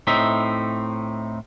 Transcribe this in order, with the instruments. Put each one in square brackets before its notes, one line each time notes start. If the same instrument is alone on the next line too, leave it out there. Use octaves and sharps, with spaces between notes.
[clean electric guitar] A2 C4 D#4 E5